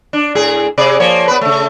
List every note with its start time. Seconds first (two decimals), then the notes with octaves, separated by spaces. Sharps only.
0.13 D4
0.35 A2 G#4
0.78 C3 G#4 D5
1.00 F3 A#3 C#5
1.28 B3 B4
1.41 C#3 A3